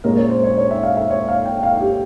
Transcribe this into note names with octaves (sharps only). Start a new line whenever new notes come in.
A#2 G#3 C#4 A#4
C#5
C5
C#5
C#5
E5
F5
E5
C#5
F5
G5
F5
G4